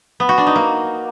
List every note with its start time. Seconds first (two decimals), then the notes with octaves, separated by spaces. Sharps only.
0.20 B3
0.29 F#4
0.38 D4
0.47 D#4
0.56 A#3